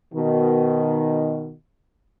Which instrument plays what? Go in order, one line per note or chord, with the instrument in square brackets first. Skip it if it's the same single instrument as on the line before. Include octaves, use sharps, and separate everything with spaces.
[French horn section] B2 D#3